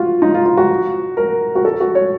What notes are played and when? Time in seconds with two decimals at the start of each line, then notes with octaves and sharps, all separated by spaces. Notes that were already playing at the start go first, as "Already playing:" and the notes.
Already playing: F4 F#4
0.22 D#4
0.34 F4
0.46 F4
0.57 F#4
1.17 A#4
1.55 F#4
1.65 A4
1.80 F#4
1.95 C#5